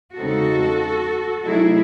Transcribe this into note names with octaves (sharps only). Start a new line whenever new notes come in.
E2 C#3 G#3 C4 D#4 F#4 A4
C3 F#3 A3 D#4 E4 G#4